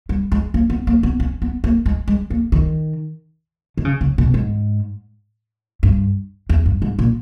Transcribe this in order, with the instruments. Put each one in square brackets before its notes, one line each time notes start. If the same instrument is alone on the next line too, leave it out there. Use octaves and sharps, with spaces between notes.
[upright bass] G3
G#3
A#3
B3
A#3
B3
C#4
B3
A#3
G#3
G#3
A#3
D#3
D#3
C#3
C#3
B2
G#2
G2
E2
G2
G#2
A#2